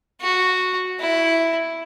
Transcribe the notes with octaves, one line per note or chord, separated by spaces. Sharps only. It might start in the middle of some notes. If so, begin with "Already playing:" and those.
F#4
E4